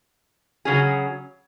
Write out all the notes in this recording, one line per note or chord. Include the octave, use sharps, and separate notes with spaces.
C#3 F#3 C#4 G#4